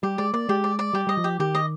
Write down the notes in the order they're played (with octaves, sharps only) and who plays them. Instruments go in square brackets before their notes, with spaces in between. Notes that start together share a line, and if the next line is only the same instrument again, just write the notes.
[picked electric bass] G3 [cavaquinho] G4
[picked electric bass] G#3 [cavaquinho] D5
[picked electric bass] A#3 [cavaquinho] D5
[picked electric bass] G#3 [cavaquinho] G4
[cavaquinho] D5
D5
[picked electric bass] G3 [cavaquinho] G4
[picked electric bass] G3 [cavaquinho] D#5
[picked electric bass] F3
[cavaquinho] G4
[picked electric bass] D#3 [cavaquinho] G4
[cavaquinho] D#5